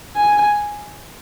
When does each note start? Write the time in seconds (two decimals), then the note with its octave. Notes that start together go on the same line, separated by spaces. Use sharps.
0.16 G#5